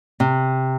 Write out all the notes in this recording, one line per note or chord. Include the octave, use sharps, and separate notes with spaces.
C3